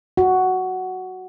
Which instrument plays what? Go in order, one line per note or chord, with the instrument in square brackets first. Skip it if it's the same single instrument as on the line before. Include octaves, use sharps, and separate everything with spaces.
[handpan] F#4